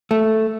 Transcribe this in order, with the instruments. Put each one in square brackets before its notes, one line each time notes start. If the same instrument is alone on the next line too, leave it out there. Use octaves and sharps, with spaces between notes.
[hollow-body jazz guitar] A3